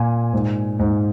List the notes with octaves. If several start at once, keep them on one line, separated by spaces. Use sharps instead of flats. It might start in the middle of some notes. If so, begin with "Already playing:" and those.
Already playing: A#2 G#5
G#2
G#2